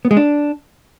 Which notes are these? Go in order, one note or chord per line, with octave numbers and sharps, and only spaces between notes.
B3
G#3
D4